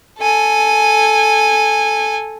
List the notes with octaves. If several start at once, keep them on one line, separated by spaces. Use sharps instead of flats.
A4 G#5